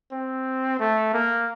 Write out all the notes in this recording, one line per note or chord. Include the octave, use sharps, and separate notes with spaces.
C4
A3
A#3